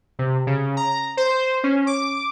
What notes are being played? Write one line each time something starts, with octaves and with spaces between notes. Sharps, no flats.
C3
C#3
A#5
C5
C#4
D6